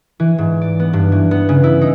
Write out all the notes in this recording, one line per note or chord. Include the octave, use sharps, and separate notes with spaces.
E3
G#2
D5
B3
G2
E3
B3
C#3
E4
D#4